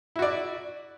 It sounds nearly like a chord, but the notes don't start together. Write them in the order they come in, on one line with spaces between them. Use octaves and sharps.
E4 F#4 D5